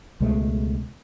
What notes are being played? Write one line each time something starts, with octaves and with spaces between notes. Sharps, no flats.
C#2 B2 G#3 A3